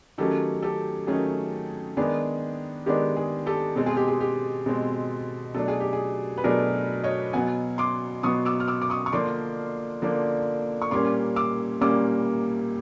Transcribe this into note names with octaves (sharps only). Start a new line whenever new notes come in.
D#3 F#3 A3 C#4 G4 A4
G4 A4
D#3 F#3 A3 C#4 G#4
D#3 G#3 B3 D4 G#4
D#3 G#3 B3 D4 G4
G#4
G4 A4
B2 G#3 C4 A4
G#4
G4
G#4
G4
B2 G#3 C4
B2 F#3 A3 D4 A4
G#4
G4
G#4
B4
B2 F#3 A3 D4 G#4 A#4
C#5 D#5
B2 F#3 B3 F#5 G#5
C6 D6
B2 F#3 B3 C#6 D#6
D6 E6
F6
D6 E6
D6
C#6 D#6
C#6
D3 F3 A#3 D4 C6 D6
D3 F3 A#3 D4
C#6
A#2 G3 A#3 C#4 C6 D6
D6 E6
A#2 G3 A#3 C#4 D6 E6